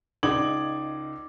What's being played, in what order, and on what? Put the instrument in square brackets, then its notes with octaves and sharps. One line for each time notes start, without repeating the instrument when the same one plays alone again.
[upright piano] C#2 D#4 D5 D6 G#6 F#7